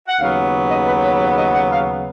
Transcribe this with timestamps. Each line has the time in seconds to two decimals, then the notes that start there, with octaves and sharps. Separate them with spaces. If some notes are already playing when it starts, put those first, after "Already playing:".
0.07 F#5
0.19 D#2 C#3 F#3 B3 F5
0.70 D#5
0.87 B4
1.04 C#5
1.20 C#5
1.38 D#5
1.55 F#5
1.72 F5